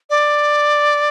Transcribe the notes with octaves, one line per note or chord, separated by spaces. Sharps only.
D5